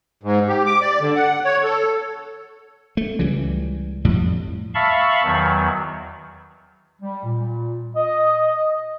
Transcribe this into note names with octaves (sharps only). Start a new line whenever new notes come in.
G#2
G4
D6
D5
D3
F#5
C#5
A4
A3
C#2 E3 G3
F2 A2 G3
E5 F5 A5 B5 C#6
E2 D#3 F#3
G3
A#2
D#5